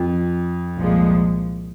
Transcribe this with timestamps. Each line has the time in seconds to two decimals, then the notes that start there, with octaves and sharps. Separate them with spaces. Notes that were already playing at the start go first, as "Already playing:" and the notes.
Already playing: F2
0.77 C2 A#2 F3 G#3